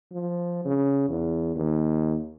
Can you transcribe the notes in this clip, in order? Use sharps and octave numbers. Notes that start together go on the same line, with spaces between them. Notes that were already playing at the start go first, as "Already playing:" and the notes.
F3
C#3
E2
D#2